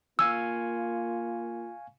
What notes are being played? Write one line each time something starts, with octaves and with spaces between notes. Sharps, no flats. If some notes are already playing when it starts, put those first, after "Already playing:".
A#3 F4 F5 G#5 C#6 E6